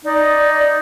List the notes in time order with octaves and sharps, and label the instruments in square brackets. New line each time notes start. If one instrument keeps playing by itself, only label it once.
[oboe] D#4 [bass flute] D5